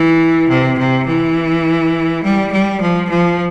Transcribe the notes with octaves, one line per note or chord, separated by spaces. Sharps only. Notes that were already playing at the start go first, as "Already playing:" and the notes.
Already playing: E3
C3
C3
E3
G3
G3
F3
F3